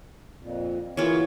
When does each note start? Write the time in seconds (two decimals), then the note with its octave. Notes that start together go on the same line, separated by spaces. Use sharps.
0.43 F2 A#2
0.97 E3 A#3 F4 F#4 G#4 C#5